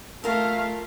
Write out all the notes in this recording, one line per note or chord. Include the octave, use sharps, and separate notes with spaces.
A3 F4 A#4 F5